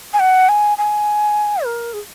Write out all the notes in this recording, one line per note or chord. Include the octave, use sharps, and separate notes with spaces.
G#5
F#5
G#5
G#5
A#4
G#4